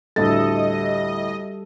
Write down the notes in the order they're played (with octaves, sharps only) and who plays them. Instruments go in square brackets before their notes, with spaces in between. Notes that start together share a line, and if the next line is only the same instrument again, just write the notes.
[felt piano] D2 A2 A6 [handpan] G3 A4 [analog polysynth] D#5